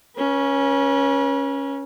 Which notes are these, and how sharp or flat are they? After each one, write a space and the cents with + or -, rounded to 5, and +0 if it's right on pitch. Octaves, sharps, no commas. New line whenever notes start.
C#4 +0 B4 -45